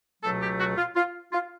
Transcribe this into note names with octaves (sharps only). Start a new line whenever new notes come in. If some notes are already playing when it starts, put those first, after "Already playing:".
C#2 B2 F#3 A3 A4
G4
F#4
F4
F4
F4